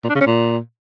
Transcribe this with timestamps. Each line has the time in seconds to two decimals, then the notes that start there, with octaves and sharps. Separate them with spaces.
0.04 A#2
0.10 D4
0.15 C#3
0.21 C#4
0.26 A#2